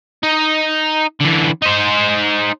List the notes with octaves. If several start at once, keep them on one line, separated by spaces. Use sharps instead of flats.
D#4
D3 E3
D#4 C5